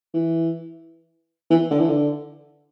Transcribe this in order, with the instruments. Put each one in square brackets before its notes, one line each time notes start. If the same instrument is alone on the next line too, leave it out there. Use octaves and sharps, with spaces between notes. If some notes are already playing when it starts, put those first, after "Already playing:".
[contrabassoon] E3
E3
D3
E3
D3